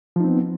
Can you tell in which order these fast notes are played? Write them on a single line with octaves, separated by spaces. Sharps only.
F3 D#4 C4 B3